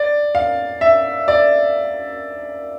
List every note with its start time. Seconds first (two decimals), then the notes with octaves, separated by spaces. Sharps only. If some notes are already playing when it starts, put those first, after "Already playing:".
Already playing: D5
0.35 F5
0.81 E5
1.28 D5